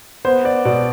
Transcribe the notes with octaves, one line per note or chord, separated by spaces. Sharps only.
B3 C5
D5
B2 D5